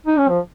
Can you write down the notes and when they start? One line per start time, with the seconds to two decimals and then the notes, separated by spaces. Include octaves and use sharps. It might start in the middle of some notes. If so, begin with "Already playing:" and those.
0.07 D#4
0.18 C#4
0.29 F3